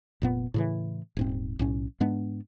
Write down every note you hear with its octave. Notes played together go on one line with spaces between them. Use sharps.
F1 A#2 B3
A2 C#3 E3
D#1 G#2 C4
B1 A2 C#4
G#2 G#3 B3 D4